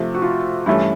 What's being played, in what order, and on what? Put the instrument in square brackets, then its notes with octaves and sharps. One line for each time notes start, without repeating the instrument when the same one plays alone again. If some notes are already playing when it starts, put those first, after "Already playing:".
Already playing: [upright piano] C3 F3 A3
[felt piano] F#4
F4
[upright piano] G2 E3 A3 C#4 [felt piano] E4